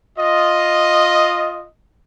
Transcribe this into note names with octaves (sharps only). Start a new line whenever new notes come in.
F4 D#5